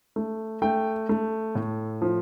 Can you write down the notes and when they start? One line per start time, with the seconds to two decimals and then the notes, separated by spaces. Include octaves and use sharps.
0.16 A3
0.62 A3 G5
1.09 A3
1.55 A2
2.02 F3